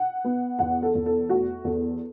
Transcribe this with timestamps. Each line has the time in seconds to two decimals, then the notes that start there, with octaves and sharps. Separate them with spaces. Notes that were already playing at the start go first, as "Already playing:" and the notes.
Already playing: F#5
0.24 B3
0.59 E2 F#5
0.83 A4
0.95 E2
1.06 A4
1.29 A3 F#4
1.64 E2 A4